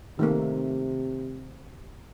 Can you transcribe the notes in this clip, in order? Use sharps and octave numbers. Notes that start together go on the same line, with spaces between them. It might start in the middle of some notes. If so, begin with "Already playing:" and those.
C3 D#3 A3 A#3